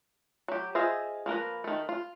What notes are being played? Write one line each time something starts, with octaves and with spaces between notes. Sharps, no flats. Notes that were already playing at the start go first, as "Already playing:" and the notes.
F#3 G4
F4 G#4 C5 D#5 E5
F3 A#3 A#4 B4
D#3 A3
F4